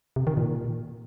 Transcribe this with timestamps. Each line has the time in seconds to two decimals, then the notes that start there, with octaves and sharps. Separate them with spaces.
0.16 C3
0.27 D#3
0.37 A#2